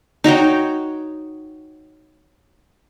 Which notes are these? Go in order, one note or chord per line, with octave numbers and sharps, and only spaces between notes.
D#4 F#4 C#5 G5